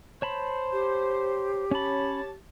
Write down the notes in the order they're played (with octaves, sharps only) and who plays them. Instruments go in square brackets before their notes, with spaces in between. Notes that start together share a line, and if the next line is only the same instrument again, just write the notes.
[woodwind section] C5 [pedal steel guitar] C#5 A5 B5
[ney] G4
[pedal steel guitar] C#4 B5 [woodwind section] C#5 A5